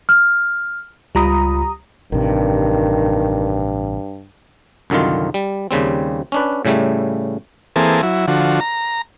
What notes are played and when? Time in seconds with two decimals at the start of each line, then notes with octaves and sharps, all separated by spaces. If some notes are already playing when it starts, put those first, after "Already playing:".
0.09 F6
1.15 C#2 G3 F4 A#5 B5 D#6
2.12 A1 G2 C3 D#3
4.90 C2 F#2 D3 D#3 F4
5.34 G3
5.71 D#2 C#3 G3 C4
6.32 C#4 D4 B4
6.65 A2 C#3 G3 A3
7.76 E3 A#3 C4 G#4 A4
8.03 F#3 E4
8.28 D3 F3 F#4
8.61 A#5